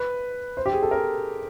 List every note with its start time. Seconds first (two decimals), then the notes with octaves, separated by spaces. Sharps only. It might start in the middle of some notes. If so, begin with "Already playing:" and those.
Already playing: B4
0.57 C5
0.66 G4
0.73 G#4
0.83 A4
0.91 A#4